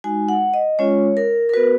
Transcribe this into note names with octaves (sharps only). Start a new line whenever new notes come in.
G#3 D#4 F#4 G#5
F#5
D#5
G#3 C#4 F4 C#5
A#4
A#4
B3 F#4 B4